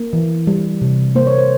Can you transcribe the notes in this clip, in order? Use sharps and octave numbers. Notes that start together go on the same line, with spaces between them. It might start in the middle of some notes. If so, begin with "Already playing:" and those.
Already playing: A#3
E3
G3
C3
A#3 C5
C#5
C5